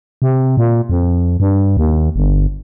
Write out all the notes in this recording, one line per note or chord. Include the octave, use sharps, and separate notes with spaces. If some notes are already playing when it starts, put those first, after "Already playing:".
C3
A#2
F2
G2
D#2
G1